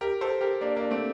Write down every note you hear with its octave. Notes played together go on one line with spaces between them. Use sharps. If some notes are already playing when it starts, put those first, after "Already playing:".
G4 A#4
A4 C5
G4 A#4
A#3 D4
A#3 D4
A3 C4